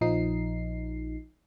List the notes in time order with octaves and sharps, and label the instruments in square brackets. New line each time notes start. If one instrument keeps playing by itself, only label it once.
[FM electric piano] A#1 F3 D#4 C7